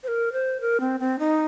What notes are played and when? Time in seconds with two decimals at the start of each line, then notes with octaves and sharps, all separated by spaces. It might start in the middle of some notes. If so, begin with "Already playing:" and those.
0.03 C5
0.08 A#4
0.33 C5
0.61 A#4
0.80 C4
1.00 C4
1.19 D#4